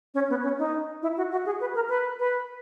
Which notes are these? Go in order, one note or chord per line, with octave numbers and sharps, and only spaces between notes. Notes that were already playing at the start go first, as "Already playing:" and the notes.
C#4
B3
C#4
D#4
E4
F#4
F#4
G#4
B4
A#4
B4
B4